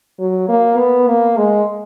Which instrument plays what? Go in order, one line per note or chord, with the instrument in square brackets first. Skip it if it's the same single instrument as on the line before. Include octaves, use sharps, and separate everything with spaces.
[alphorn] F#3
A#3
B3
A#3
G#3